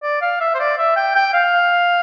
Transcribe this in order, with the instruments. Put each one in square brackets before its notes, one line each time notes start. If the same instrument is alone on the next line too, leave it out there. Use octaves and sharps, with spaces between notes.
[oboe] D5
F5
E5
C5
D5
E5
G5
G5
F5